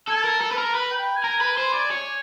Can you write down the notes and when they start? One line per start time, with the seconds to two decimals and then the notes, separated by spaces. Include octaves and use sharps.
0.08 A4 G#5
0.16 A5
0.25 A#4
0.41 A4
0.52 B4
0.58 A#4
0.75 B4
0.91 G5
1.16 G#5
1.24 A#4
1.41 B4
1.57 C5
1.74 D5
1.91 C#5